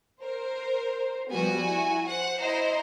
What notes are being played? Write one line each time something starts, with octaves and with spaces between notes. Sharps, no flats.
A#4 C5
F3 G3 B3 F#4 G#5
E4
C5 F#5
E4 C5 D#5 A#5